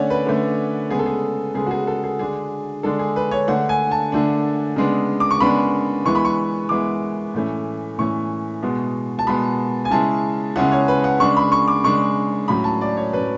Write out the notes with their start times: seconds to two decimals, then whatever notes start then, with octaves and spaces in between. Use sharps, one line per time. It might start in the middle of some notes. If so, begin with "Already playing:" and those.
Already playing: D3 A3 C#4 C#5 D5 F#5
0.10 B4
0.26 D3 A3 C#4
0.90 C#3 G#3 B3 G#4
0.99 A4
1.06 G#4
1.55 C#3 G#3 B3 G#4
1.66 F#4
1.71 G#4
1.87 A4
2.04 G#4
2.19 D3 G#3 D4 G#4
2.83 D3 G#3 D4 A4
2.99 G#4
3.16 B4
3.31 C#5
3.48 D3 A3 D4 F#5
3.69 G#5
3.91 A5
4.12 D3 A3 D4
4.76 C#3 G#3 B3 D4
5.20 D6
5.31 C#6
5.40 C#3 G#3 B3 D4 B5
6.05 E3 G#3 B3 E4 C#6
6.15 B5
6.25 C#6
6.69 E3 G#3 B3 E4 D6
7.34 A2 E3 A3 C#4
7.98 A2 E3 A3 C#4 C#6
8.63 B2 G#3 B3
9.19 A5
9.27 B2 G#3 B3 B5
9.85 G#5
9.91 C#3 G#3 C#4 E4 A5
10.56 C#3 G#3 C#4 E4 F#5
10.72 C#5
10.88 B4
11.04 F#5
11.20 C#3 G#3 D4 C#6
11.37 B5
11.52 C#6
11.68 D6
11.84 C#3 G#3 D4 C#6
12.48 A2 F#3 C#4 B5
12.64 A5
12.81 D5
12.97 C#5
13.13 A2 F#3 C#4 B4